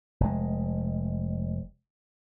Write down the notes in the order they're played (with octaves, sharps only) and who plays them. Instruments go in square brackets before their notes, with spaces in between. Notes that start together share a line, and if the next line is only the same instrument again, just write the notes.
[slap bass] F1 G#3